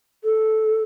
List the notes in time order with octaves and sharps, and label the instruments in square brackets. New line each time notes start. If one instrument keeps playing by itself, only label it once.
[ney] A4